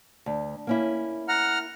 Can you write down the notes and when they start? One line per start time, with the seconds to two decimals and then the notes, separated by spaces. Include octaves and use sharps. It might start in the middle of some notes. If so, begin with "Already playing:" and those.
0.26 D2
0.67 A#3 C#4 E4
1.28 F#5 A#5 F6